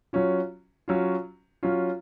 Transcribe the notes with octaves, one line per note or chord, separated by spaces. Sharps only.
F#3 C#4 F4
F#3 C#4 F4
F#3 C#4 F4